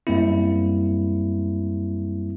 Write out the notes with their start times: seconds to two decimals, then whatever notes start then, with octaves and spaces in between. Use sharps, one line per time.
0.07 F#2 G3 A#3 C4 E4